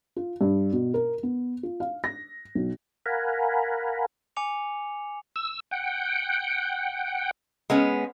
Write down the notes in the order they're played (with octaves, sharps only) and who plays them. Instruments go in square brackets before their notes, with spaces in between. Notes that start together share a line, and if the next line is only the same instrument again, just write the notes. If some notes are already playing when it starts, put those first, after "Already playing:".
[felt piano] F4
G2
B2
A#4
B3
F4
F5
A#6
B1
[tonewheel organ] A#4 F5 F#5 G#5 A#5 B5
[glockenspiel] G#5 D6 C#7 F7
[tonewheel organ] E6
F#5 G5
[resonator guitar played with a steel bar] G#3 B3 C#4